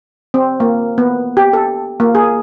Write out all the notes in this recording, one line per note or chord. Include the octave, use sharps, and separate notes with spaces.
C4
A#3
B3
G4
A4
A#3
G#4